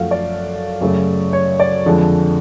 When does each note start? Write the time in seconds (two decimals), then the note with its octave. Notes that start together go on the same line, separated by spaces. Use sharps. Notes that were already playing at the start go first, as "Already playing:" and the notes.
Already playing: F#2 F3 A3 F5 F#5
0.11 D5
0.81 F#2 C#3 F#3 A3
1.33 C#5
1.60 D5
1.86 F2 D3 F3 G#3